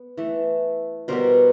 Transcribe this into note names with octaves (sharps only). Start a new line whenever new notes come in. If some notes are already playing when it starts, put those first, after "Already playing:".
Already playing: B3
E3 A3
B2 G3 B3 A#4 C5